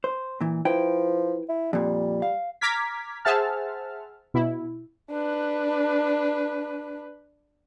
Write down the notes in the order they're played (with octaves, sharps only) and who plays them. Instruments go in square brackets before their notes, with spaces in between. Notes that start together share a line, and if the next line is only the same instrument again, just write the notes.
[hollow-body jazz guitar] C5
A#2 E3
[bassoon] F3 [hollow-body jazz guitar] E4 B4 G5
[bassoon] E4
[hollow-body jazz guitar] F2 A#2 [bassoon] G3
[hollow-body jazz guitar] F5
[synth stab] A#5 D6 F6 G#6 B6
G#4 C5 E5 F#5 A5 F6
B2 E4
[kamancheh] D4 B4